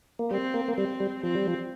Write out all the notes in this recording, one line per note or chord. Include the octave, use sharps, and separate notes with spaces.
A#3
G3 C4
A#3
A#3
G3 C4
G3
F3 C4
G3
F3